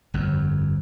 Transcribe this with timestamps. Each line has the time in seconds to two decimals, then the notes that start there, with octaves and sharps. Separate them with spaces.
0.14 G1 F2